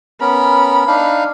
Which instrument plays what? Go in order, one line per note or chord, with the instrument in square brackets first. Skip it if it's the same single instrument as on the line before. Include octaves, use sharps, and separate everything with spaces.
[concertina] B3 C#4 A#4 [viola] B5
[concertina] D4 D#4 F5